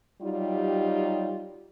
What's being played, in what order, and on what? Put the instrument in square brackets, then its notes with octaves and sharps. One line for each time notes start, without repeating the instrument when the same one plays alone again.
[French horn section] F#3 G3 D#4 F4 G4